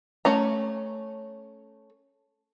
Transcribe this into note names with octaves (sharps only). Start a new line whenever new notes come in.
A3 C#4 A#5